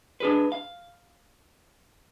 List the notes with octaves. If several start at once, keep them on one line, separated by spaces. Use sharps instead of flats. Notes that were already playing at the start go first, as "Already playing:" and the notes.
D4 G#4 B4
F5